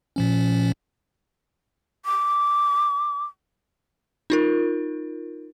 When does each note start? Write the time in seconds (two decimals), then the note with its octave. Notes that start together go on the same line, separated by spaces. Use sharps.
0.16 A#2 F3 C#4
2.05 D6
4.30 D#4 F4 A#4